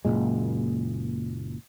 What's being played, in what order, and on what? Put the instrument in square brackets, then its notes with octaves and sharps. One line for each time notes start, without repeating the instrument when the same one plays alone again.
[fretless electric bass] F#1 C#2 A#2 G#3